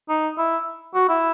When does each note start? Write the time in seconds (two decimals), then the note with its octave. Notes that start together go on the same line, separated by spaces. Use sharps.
0.09 D#4
0.38 E4
0.95 F#4
1.09 E4